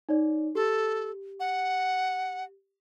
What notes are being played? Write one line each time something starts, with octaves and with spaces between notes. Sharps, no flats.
D#4 C#5 D5
G4 A4
F#5